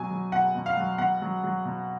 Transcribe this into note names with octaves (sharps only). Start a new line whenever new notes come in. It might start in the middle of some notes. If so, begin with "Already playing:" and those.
Already playing: B2 F#3 G#5
F#3
B2 F#5
B2
F5
F#3
B2 F#5
F#3
F#3
B2